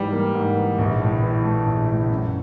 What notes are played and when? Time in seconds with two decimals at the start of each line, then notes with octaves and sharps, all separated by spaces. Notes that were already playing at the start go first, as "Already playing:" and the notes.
Already playing: G#2 E3 G3
0.12 A#3
0.34 G#2
0.57 E3
0.79 A#1
1.01 A2
1.23 E3
1.44 A3
1.66 A#1
1.89 A2
2.10 F#2